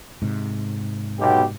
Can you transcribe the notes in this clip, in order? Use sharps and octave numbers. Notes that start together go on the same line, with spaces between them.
G#2 C3
B1 B2 G4